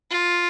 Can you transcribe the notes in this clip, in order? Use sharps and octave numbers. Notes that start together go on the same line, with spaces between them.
F4